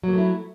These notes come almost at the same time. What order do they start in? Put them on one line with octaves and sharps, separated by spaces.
F#3 A#3 A3 E4